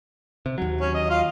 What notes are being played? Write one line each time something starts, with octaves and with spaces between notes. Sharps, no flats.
C3
D#2 F#3
C#4
D#5
F4 F5